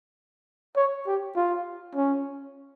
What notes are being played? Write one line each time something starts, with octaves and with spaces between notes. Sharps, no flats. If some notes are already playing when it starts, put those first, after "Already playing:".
C#5
G4
F4
C#4